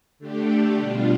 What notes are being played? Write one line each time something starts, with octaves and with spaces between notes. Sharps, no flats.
D3 A3 D4 G4
B2 G3 D4 F4